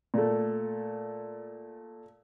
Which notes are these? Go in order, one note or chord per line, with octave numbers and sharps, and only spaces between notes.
A#2 A3